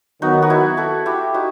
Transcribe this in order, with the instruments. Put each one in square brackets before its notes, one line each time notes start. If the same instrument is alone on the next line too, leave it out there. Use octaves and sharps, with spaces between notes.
[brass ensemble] D#3 F#3 B3 [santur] D#4 F#4
[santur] F#4
E4
F#4 A4
E4 G4
D#4 F#4